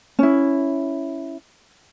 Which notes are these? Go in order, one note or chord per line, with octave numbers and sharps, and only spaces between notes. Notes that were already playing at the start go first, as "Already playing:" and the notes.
C#4 E4